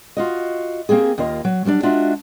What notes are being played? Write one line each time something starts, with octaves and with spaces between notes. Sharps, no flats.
F4 F#4 D#5
A#3 C4 G4 G#4
D#2 A#3 F4 D#5
F#3
F#3 G3 C#4 D4
G#3 D4 F4 F#4 E5